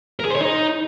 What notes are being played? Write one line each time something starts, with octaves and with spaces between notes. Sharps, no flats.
A#4
G#4
C5
C#5
D#4